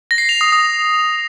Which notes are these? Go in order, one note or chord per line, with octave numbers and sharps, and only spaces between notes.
A#6
C7
F7
D#6
D#6